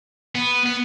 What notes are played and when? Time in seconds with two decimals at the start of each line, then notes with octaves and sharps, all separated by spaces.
0.35 B3
0.66 B3